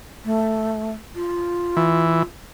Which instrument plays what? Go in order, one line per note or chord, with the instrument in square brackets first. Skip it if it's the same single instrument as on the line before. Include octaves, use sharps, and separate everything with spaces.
[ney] A3
F4
[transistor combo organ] E3